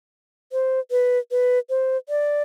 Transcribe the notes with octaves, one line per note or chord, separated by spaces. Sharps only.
C5
B4
B4
C5
D5